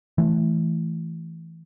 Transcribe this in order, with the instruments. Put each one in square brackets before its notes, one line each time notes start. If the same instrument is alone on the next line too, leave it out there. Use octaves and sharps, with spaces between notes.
[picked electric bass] E3 A3